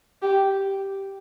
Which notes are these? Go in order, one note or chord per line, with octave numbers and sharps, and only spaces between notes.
G4